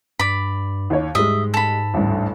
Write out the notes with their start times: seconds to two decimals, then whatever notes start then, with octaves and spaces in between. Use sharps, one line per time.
0.19 G2 D5 B5
0.90 D#2 C#5
1.15 G#2 G3 G#3 D#5 E5
1.54 A4 B5
1.94 A1 D2 G2